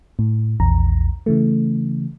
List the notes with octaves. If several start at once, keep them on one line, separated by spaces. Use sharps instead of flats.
A2
A#1 E2 A#5
C#3 E3 A3